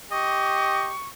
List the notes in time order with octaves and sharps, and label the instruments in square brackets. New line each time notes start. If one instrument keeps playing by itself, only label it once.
[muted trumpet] G4 [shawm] D#5 [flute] C#6